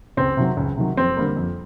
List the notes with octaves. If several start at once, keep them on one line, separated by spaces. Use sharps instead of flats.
C#2 C4
C3 D#3 F#3
C#2
C3 D#3 F#3
F2 C4
D3 G3 A#3
F2